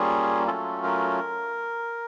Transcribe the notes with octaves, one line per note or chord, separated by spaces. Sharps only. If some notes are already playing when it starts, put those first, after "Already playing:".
Already playing: G3 A#3 C#4 F4 G#4
F#3 A3 C#4 F4 A4
A#4